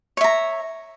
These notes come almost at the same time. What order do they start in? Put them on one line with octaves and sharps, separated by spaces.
C#5 E5 A#5